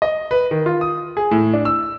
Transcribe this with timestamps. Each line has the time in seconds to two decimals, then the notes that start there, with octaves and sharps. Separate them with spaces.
0.02 D#5
0.31 B4
0.51 D#3
0.66 F4
0.81 D#6
1.17 G#4
1.31 A2
1.54 D4
1.65 E6